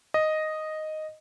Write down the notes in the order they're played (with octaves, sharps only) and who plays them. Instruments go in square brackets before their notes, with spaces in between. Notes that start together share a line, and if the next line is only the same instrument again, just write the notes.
[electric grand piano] D#5